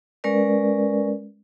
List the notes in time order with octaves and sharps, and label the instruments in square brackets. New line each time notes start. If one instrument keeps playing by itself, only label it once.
[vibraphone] G#3 C#4 A#4 B4 D5